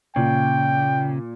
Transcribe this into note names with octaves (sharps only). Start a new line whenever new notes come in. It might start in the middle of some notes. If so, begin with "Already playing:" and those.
A#2 C#3 G5